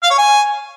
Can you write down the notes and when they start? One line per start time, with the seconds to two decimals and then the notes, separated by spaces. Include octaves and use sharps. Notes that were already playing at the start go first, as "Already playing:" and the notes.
0.03 F5
0.11 C#5
0.18 G#5